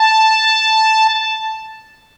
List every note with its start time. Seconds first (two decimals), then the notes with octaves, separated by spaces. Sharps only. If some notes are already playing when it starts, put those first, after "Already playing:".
Already playing: A5